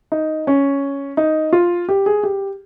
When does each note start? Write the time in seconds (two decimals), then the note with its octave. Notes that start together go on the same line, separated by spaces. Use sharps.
0.12 D#4
0.47 C#4
1.17 D#4
1.53 F4
1.89 G4
2.06 G#4
2.23 G4